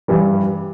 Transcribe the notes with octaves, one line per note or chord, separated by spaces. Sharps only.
G2 E3 G3